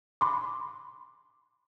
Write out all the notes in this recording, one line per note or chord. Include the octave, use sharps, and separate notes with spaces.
B5 C6 D6